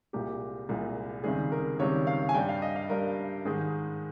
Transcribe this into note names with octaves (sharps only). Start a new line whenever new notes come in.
C2 A#2 G#3 G4
C2 A#2 G#3
C#2 C3 D#3 G3 G#4
A#4
C#2 C3 D#3 G3 C#5
F5
G#5
G2 G3 G5
F5
D#5
F5
G2 G3 A#4
G#2 D#3 G#3 G#4